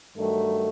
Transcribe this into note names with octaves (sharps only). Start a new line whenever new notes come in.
G2 D#3 F#3 A3